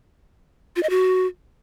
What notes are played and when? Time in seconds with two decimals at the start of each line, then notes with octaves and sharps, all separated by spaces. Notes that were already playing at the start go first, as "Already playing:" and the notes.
0.76 F4
0.83 D#5
0.90 F#4